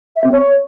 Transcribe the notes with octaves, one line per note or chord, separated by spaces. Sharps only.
E5
C4
C#5